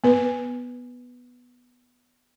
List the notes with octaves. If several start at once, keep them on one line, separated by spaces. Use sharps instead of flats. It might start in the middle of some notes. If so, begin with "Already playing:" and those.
B3 B4